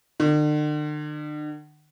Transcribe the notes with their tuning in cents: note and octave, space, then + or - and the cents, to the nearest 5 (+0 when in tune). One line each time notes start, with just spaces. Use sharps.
D3 +45